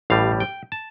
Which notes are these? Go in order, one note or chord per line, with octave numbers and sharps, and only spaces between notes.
A1 A2 G3 F5
G5
A5